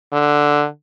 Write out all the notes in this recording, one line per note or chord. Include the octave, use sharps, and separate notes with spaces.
D3